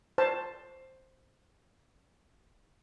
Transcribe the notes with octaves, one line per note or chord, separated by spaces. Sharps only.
C5 A5